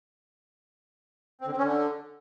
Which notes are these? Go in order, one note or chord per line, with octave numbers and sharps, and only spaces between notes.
C4
D3
C4
C#4
D3